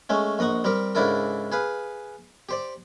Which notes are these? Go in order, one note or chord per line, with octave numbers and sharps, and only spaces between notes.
G#3 A3 C#4
A#1 D#5 F#5 A#5 C#6
G3 C4 G4 A#4
G#2 C#3 D4 E4 A4 A#4
G#4 B4 F5
G4 C5 D5